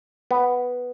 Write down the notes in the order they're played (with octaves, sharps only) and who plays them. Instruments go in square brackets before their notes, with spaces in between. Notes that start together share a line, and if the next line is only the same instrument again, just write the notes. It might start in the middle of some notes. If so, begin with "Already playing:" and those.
[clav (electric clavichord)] B3